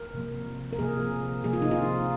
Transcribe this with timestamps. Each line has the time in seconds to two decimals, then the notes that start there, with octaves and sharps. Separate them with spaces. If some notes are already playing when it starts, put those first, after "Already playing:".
Already playing: A#4
0.14 C3 F3 A#3
0.73 A#4
0.79 C3 F3 A#3 G#4
1.44 C3 F3 A#3 G#4
1.53 F4
1.62 D#4
1.71 F4